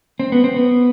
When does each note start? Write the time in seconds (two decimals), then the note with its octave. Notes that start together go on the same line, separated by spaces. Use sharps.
0.19 C4
0.32 B3
0.44 C4
0.56 B3